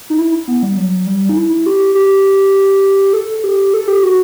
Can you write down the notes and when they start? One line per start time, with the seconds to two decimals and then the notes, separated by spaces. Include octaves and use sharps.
0.10 D#4
0.18 E4
0.48 B3
0.63 G3
0.77 F#3
1.07 G3
1.29 D#4
1.36 E4
1.66 G4
1.95 G4
3.13 A4
3.44 G4
3.74 A4
3.88 G4
4.03 F#4